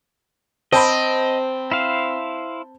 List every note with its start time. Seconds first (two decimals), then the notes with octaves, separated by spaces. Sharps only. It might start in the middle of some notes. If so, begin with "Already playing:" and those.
0.73 C4 D#5 A5 B5
1.71 E4 C5 F5